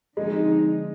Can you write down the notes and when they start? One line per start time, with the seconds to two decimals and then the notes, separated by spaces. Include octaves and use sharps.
0.17 D3 F3 G#3 C4 D#4